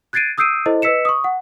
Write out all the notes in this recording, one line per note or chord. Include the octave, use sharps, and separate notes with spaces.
F#6 G#6 A6 C7 D7 D#7
D#6 E6 G6 C7 D7 D#7
E4 A4 C5 D#5
B4 D#5 E6 B6 C#7 E7
C#6 D#6
F#5